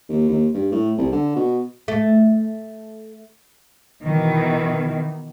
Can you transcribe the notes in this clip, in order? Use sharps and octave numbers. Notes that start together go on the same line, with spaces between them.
D#2
D#2
G2
A2
C2
D3
B2
A3
B2 D#3 E3